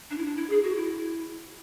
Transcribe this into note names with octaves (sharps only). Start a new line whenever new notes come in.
D4
E4
D4
E4
G#4
F#4
E4